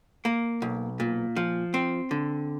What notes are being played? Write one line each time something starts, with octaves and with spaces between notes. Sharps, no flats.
A#3
B1
A#2
F3
C4
D3